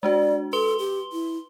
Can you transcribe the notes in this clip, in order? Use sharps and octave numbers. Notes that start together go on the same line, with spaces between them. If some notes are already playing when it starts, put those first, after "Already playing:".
G#3 D4 F#4 D5
A4 B4 C6 G7
G4
E4